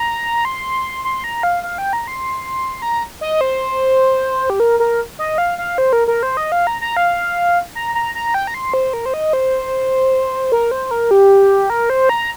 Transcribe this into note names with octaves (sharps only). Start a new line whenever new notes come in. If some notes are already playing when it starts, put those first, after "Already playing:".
Already playing: A#5
C6
C6
A#5
F5
F5
G5
A#5
C6
A#5
D#5
C5
G4
A#4
A#4
D#5
F5
F5
C5
A#4
A#4
C5
D#5
F5
A#5
A#5
F5
A#5
A#5
A#5
G5
A#5
C6
C5
A#4
C5
D#5
C5
A#4
C5
A#4
G4
A#4
C5
A#5